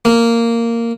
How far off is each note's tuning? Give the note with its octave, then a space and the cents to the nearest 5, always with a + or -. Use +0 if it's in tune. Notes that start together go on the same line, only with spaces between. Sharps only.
A#3 -10